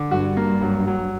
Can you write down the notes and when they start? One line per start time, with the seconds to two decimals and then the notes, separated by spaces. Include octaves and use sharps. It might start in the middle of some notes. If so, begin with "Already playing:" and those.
Already playing: D3
0.11 G2 F#4
0.37 A#3
0.62 F#3
0.87 F#3